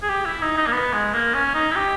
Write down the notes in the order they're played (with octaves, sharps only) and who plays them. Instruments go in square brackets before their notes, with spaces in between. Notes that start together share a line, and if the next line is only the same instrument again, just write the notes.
[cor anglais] G#4
G4
E4
D#4
D#4
A#3
B3
G#3
A#3
C#4
D#4
E4
G4